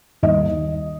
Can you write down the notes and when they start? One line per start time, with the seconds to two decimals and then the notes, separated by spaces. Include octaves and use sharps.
0.23 D#2 D#3 G3 D#5